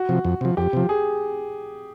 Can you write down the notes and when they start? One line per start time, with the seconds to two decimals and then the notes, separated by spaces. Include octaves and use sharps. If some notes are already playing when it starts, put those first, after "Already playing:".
Already playing: F#4
0.09 C3 F3
0.25 F2
0.41 C3 F3
0.57 F2 G4
0.73 C3 F3
0.89 G#4